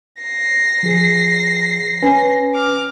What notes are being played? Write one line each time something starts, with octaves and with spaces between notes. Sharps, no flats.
A#6 C7
F3 G#4
C#4 B4 G#5
D6 F6